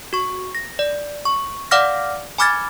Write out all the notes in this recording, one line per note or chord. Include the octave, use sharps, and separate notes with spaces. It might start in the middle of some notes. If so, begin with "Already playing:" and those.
F#4 C#6
A#6
D5
C#6
D5 F5 F#5 D6 F6 A#6
G#5 B5 D6 F6 G#6 A6